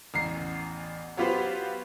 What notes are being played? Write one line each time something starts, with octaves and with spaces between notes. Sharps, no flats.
A1 E2 A#5 C7
F#3 B3 F4 G4 B4 C5